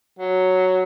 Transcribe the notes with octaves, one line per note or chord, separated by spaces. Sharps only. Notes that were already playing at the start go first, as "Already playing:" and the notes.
F#3